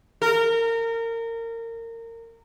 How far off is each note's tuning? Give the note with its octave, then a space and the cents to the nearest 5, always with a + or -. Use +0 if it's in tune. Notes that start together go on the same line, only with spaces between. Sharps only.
A#4 -25